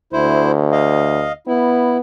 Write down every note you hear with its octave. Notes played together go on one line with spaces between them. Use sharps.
D2 E4 C5
D#5 F5
B3 E4